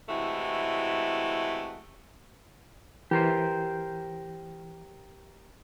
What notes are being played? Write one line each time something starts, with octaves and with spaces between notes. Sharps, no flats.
C3 E3 G#3 A3 E4 F#4
E3 G4 A#4 C5